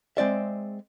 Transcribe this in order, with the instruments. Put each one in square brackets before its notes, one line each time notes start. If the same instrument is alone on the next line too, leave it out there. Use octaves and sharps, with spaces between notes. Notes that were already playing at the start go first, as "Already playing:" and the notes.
[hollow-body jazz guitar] G#3 C4 D5 E5